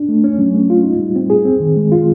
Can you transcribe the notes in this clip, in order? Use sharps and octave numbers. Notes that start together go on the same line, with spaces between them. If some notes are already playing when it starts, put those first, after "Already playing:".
Already playing: D4
A3
C#4
F#3
A3
F4
D#4
G3
C4
G#4
C4
D#3
G#3
F4